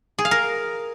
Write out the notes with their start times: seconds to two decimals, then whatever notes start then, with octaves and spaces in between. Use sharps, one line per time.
0.19 G#4
0.25 F5
0.31 A#4